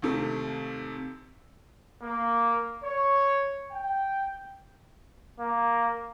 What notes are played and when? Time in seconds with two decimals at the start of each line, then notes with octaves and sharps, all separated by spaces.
0.02 D#2 C3 A3
2.02 A#3
2.83 C#5
3.72 G5
5.39 A#3